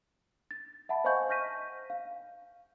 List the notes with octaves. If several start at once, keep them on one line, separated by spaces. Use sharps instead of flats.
A6
E5 F#5 A5 B5
C5 D#5 F5 G#5 C#6 G6
C#6 F6 G6 A#6 B6 D#7
F5